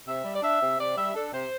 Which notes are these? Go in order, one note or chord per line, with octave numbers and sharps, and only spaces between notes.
C3 E5
G3
D5
D4 E5
C3
C3 D5
G3 E5
D4 A4
C3 C5